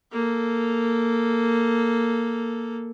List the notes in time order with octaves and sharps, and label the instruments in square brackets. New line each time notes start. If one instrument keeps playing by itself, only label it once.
[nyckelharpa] A#3 A4